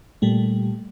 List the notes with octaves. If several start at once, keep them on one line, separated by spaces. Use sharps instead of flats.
A#2 G3 A3